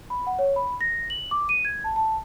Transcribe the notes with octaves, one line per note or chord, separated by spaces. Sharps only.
B5
F#5
C#5
B5
A#6
F#7
D6
D#7
G#6
A5
A5